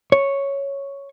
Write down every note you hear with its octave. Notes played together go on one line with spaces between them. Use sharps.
C#5